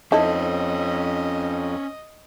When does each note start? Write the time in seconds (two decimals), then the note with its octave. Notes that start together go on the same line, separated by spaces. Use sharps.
0.12 F2 C#4 D#4 E4 A4 C5 D#5